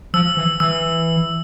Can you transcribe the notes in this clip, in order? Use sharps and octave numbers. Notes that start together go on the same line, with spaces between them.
F3 E6
E3
E3 E6